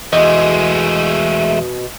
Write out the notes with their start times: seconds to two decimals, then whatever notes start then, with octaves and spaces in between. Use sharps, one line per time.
0.13 E2 B2 G#3 A3 D#5